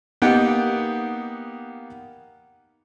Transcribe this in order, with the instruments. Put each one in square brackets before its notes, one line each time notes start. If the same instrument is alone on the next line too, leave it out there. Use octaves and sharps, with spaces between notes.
[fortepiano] A#3 B3 D#4 G4 F#5 G5